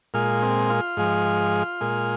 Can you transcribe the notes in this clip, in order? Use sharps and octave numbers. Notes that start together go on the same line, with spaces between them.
A#2 G#3 F4
C4
F4
G#2 F3 G#3
A#2 G#3